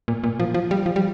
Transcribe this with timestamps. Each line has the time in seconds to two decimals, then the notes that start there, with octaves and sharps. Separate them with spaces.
0.08 A#2
0.24 A#2
0.40 F3
0.54 F3
0.71 G3
0.86 F3
0.96 G3